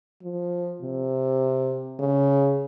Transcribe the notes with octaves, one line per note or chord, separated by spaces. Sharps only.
F3
C3
C#3